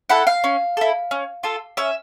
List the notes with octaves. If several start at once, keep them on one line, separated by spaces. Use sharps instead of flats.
E4 A4 F#5
F5
C#4
E4 A4
C#4
F4 A4
C#4 E5